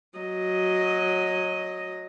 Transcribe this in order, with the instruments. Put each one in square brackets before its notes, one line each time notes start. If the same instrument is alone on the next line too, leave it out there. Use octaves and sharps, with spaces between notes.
[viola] F#3 D#5